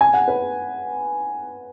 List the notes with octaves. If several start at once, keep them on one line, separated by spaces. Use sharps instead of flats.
G#5
F#5
B4